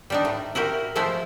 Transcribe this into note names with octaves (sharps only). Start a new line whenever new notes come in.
G3 D4 D#4
A2
E4 F#4 G4 A#4
F3 G#3 A3 E4 C5 E5